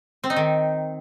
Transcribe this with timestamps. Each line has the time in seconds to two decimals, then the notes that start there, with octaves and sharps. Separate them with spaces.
0.24 C4
0.30 D#4
0.36 D#3